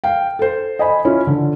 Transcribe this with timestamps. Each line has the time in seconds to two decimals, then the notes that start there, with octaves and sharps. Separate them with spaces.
0.04 F5 G5
0.39 A4 C5
0.79 D#5 G#5 B5
1.05 C#4 E4 F4
1.27 D3